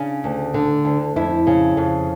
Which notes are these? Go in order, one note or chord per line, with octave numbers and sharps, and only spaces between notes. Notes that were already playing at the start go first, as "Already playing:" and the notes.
Already playing: C#3 D4
D2
D3
D2
F2 E4
C#3
F2